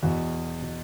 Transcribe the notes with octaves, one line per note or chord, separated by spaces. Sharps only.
E2 B2 F#4
B2